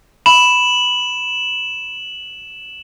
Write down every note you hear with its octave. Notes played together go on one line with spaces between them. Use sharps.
B5 E7 F#7